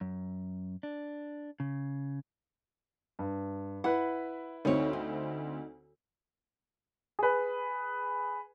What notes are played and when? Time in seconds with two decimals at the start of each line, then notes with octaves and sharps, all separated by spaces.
0.01 F#2
0.83 D4
1.60 C#3
3.19 G2
3.84 E4 B4 F#5
4.65 D2 C4 D#4 C#5
4.93 D#4
7.19 G#4 B4